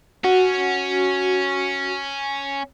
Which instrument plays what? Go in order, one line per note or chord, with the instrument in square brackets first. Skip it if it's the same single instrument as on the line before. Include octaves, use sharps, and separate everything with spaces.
[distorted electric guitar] C#4 [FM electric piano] F#4